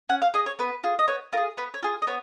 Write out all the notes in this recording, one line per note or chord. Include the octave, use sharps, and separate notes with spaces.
C#4 F#5
F5
G#4 D#5
C#5
B3 B4
F4 G#4
D#5
B3 C#5
F4 G#4 A#4
B3 B4
C#5
F4 G#4
D#5
B3 C#5